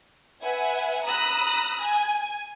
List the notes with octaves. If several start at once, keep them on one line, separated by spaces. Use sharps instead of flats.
B4 E5 F#5 G#5
A#5 B5 D#6 E6 F#6 A#6
G#5